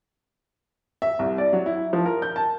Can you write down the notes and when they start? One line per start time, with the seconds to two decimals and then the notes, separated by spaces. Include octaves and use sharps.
1.02 E5
1.19 C2
1.38 D5
1.53 F#3
1.66 E4
1.93 F3
2.06 A#4
2.22 G6
2.36 A5